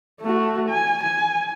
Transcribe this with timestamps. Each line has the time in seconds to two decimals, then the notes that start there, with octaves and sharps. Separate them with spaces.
0.21 A3 F#4
0.69 G#5
1.03 G#5